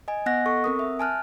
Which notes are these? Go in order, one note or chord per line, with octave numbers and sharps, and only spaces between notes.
D#5 G#5
B3 D#5 F#5 F#6 A#6
A4 C#6
C4 A#4 D#6
E5
G#5 A5 F6 F#6